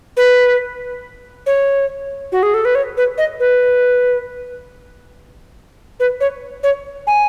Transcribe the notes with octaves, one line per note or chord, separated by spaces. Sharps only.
B4
C#5
F#4
G#4
A4
B4
C#5
B4
D#5
B4
B4
C#5
C#5
G#5